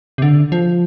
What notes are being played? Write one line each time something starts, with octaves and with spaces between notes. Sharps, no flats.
C3
D3
F3